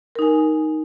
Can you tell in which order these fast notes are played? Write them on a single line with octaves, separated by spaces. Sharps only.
A#4 D#4 G#5